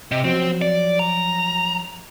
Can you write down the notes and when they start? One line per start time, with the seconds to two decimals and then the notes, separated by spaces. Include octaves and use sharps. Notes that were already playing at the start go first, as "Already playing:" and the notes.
0.12 C3 D#5
0.24 F3 F#3 C4 F#4
0.62 D5
0.99 A#5